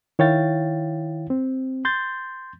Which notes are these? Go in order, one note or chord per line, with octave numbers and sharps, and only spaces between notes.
D#3 E4 C#5 F5 G5 A6
C4
C6 G6 A6